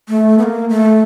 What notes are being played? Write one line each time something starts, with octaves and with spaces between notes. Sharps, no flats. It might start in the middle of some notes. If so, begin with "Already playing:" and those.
A3
B3
A#3
A3